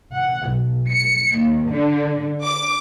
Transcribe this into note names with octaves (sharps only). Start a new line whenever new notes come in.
F#5
B1
C#7
D#2
D3
D6